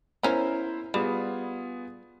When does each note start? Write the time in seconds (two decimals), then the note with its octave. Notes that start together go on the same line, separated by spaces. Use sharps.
0.23 B3 C#4 E4 A#4 C5 A#5
0.94 G3 B3 F4 G#4